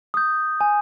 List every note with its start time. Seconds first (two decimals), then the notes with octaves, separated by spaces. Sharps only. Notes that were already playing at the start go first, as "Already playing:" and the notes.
0.14 D#6 G6
0.61 G#5